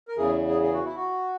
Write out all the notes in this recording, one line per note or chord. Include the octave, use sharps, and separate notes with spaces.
A#4
E2 C#3 E3 G#4
G#4
G#4
F#4
E4
F#4